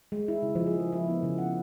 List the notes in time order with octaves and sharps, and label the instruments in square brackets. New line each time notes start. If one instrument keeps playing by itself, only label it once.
[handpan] G#3
E4
C#3
F3
G#4
A#4
E4
B3
C#3
F#5